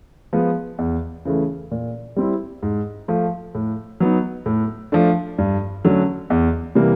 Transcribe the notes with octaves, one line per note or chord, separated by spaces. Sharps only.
F3 G#3 B3
E2
C#3 E3 A3
A#2
G3 C4 E4
G#2
F3 A3
A2
F#3 B3 D#4
A2
F3 A3 D4
G2
D3 F#3 A3 C#4
E2
C3 E3 G3 A#3